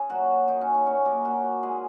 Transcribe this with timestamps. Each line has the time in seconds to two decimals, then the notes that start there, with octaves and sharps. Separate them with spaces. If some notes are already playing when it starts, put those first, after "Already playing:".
Already playing: C#4 G#4
0.09 A#2 F#3 F#4
0.29 F#3
0.48 F#2 D#3 D#4
0.61 C#4
0.67 F#3
0.74 C#4
0.86 A#2 C#4 C#5
1.05 F#3 A#3 A#4
1.24 A#2 F#3 F#4
1.44 F#3
1.63 A#2 G#3 G#4